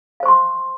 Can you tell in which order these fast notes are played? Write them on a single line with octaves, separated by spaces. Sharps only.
F5 C5 C#6 C6